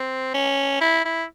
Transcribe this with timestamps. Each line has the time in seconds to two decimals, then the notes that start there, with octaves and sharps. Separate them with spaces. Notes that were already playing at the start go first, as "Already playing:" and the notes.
Already playing: C4
0.34 C#4
0.81 E4
1.05 E4